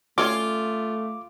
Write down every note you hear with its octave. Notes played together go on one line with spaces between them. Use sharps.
A3 C#4 F4 C#5 D5 D6